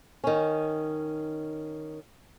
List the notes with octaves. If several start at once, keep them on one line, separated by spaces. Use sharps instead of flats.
D#3 C#4